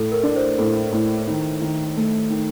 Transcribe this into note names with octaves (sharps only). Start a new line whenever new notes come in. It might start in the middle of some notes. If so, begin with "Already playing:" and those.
Already playing: A2 A4
A#4
D4
C5
A2 A4
A2
D#3
D#3
A3
D#3